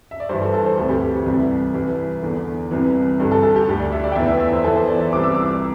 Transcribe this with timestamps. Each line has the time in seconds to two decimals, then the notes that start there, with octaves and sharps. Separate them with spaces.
0.11 E5
0.20 D5
0.29 G2 E3 C5
0.42 A4
0.54 A4
0.66 C5
0.77 D2 C3 E3 A4
0.90 G4
1.01 G4
1.26 C2 C3 E3
1.74 C2 C3 E3
2.22 E2 D3
2.71 C2 C3 E3
3.20 G2 D3
3.32 A4
3.43 A4
3.56 G4
3.68 D2 D3
3.80 D5
3.92 E5
4.04 D5
4.12 G5
4.16 E2 E3 E5
4.28 E5
4.40 E5
4.53 C5
4.64 E2 E3 A4
4.77 C5
4.88 D5
5.01 E5
5.12 C2 C3 E3 D6
5.24 E6
5.35 D6